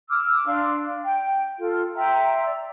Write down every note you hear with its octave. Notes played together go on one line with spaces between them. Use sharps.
D6 E6 F6
D4 F5 C6
G5
F4 A4
E5 G5 A#5 C6
D5